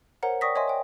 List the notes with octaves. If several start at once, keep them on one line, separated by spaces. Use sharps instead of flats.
A#4 C5 C#5 F#5 A#5
D5 G5 C#6 D#6 A#6 B6
C#5 D#5 E5 G#5 C6
C#5 G5